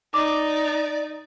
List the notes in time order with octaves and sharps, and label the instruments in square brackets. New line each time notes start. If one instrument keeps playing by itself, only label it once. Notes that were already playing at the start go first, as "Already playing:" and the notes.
[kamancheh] D#4 [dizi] D5 [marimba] D6